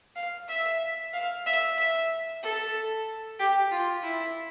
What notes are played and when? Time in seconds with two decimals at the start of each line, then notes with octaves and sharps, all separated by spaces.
0.16 F5
0.48 E5
1.13 F5
1.46 E5
1.78 E5
2.43 A4
3.39 G4
3.71 F4
4.03 E4